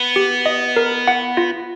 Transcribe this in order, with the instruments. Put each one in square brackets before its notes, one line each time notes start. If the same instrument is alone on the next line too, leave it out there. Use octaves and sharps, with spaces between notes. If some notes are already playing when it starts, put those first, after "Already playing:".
Already playing: [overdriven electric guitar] B3
[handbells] G4
D#5
A#4
F#5
F4